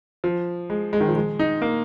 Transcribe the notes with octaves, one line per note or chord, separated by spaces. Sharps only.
F3
G#3
G#3
D#3
F3
G#3
D#4
A#3